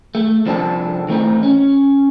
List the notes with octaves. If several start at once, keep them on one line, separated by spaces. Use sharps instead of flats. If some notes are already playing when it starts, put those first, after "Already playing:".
A3
C2 F3 C4 D4 A4
E3 A3 C4 D#4
C#4